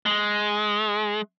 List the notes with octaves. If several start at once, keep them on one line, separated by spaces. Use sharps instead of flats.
G#3